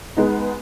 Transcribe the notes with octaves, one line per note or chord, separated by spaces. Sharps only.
G#3 B3 D#4